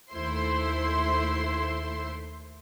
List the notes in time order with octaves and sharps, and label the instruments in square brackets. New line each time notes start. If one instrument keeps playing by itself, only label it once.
[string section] D#2 A3 E4 C5 C6